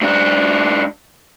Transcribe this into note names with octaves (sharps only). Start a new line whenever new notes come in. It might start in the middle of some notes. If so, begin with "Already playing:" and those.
G#2 D4